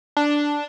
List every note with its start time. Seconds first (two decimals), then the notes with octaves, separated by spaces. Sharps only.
0.17 D4